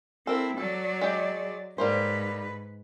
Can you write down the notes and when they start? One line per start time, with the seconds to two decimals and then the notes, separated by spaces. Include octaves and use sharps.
0.27 C4 E4 A4 A#4
0.58 F#3 A4 D5
1.01 G#3 G4
1.78 G#2 G3 A#3 B4 C5